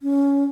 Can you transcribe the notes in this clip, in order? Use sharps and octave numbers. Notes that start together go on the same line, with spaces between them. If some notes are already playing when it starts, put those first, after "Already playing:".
C#4